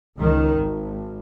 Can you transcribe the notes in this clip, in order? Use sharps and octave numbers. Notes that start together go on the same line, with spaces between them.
C#2 D#3
G#1